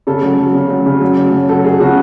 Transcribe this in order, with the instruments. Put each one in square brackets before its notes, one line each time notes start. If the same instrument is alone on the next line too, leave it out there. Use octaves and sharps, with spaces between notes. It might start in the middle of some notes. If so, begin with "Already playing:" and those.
[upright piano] C#3 A4
F#3
F#3
C#3
F#3
C#3
F#3
F#3
F#3
F#3 A4
F#3 G#4
C#3 F#4